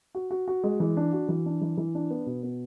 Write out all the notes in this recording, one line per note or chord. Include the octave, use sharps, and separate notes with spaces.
F#4
F#4
F#4
G#3
E3
D4
F#4
E3
D4
E3
E3
D4
B3
B2
B3